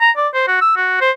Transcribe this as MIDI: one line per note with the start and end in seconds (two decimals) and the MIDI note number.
0.01 0.11 82
0.17 0.28 74
0.34 0.43 72
0.48 0.61 66
0.61 0.74 88
0.77 0.98 66
1.01 1.11 72